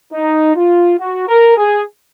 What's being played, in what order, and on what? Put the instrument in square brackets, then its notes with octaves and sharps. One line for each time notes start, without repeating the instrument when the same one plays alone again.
[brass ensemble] D#4
F4
F#4
A#4
G#4